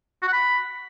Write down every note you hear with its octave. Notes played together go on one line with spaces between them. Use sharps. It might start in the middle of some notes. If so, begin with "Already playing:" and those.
F#4
F#5
B5